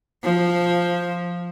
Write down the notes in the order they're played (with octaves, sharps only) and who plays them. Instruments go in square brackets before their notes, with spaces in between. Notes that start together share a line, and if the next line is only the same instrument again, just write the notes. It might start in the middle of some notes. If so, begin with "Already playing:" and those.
[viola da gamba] F3